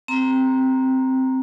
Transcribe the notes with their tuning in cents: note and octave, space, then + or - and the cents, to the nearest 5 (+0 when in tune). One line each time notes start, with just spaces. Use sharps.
C4 +0 A#5 +0